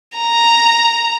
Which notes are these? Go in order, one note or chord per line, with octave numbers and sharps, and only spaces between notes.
A#5